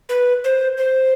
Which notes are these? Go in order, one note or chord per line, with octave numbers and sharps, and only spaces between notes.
B4
C5
C5